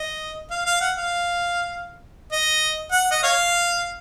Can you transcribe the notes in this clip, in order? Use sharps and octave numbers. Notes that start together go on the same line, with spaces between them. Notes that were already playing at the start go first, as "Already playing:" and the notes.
Already playing: D#5
F5
F5
F#5
F5
D#5
F#5
D#5
C#5 F5